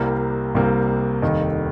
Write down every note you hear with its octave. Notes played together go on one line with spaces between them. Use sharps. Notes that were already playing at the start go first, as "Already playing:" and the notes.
Already playing: C2 C3 G3 A#3
C2 C3 G3 A#3
F1 D#2 D#3 G3 D#4